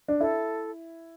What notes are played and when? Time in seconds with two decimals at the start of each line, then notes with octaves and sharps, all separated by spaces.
0.08 D4
0.20 E4 A4